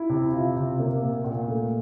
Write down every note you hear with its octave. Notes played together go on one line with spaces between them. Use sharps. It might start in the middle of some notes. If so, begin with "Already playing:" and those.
Already playing: E4
C3
F4
C3
A#3
A#2
A#2
A3